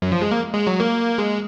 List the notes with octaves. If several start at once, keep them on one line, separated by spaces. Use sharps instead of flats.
F#2
F3
G#3
A#3
G#3
F#3
A#3
G#3